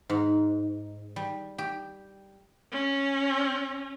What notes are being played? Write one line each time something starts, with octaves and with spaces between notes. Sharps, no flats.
G#2
G3
G4
C#4